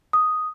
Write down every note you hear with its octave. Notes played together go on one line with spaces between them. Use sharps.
D#6